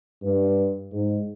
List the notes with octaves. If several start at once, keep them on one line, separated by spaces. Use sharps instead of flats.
G2
G#2